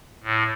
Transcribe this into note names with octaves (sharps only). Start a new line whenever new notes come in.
A2